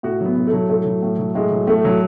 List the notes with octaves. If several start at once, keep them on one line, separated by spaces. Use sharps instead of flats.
A2 F#4
F#3
B3
A2
A3
F#3
A2 A3
F#3
A2
F#3
A2 G#3
F#3
A2 A3
F#3